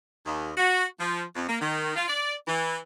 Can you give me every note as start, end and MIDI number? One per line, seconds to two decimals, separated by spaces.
0.26 0.51 39
0.57 0.84 66
1.00 1.23 53
1.36 1.46 41
1.48 1.57 58
1.61 1.95 51
1.96 2.08 65
2.08 2.34 74
2.48 2.78 52